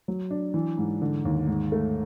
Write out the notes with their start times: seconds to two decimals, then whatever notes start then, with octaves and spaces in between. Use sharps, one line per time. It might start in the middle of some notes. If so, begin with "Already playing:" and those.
0.08 F#3
0.31 D4
0.54 E3
0.78 G#2
1.02 D3
1.25 D#2
1.47 G#2
1.72 A3